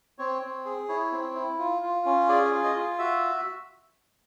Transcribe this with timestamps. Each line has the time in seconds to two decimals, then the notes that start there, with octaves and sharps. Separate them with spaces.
0.19 C4 C#5
0.42 C4
0.65 G#4
0.89 E4 C#5
1.12 C4
1.35 E4
1.59 F4
1.82 F4
2.06 C#4
2.29 G#4 D5
2.52 F4
2.64 D#5
2.75 F4
2.98 F#4 E5